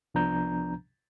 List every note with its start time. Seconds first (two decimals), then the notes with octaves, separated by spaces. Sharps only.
0.14 C2 F3 B3 D4 A#5 G6